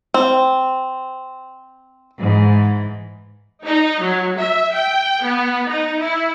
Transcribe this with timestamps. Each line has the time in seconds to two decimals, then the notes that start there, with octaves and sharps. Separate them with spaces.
0.14 C4
2.18 G#2 E3
3.64 D#4
4.01 F#3
4.38 E5
4.76 G5
5.23 B3
5.68 D#4
6.01 E4